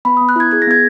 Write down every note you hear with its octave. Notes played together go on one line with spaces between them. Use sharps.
B3 B5
B3 D#6
F#6
E4 G#6
G#4 G#6
A#6
B3 G#6